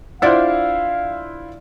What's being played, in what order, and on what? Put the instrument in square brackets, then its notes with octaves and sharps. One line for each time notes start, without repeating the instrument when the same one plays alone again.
[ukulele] D4 D5 F#5 [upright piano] E4 F4 C5 [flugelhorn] F5